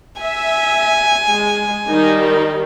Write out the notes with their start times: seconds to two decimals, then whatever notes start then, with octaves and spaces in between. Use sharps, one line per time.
0.21 E5 G#5
1.29 G#3
1.89 D#3 G3 D#4